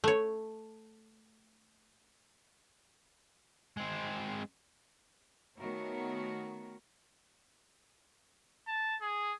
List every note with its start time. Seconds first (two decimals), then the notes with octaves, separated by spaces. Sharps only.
0.04 A3 C#5
3.77 G#3 C4
5.60 D#3 A3 B3 F#4 A#4 C#5
8.68 A5
9.01 G#4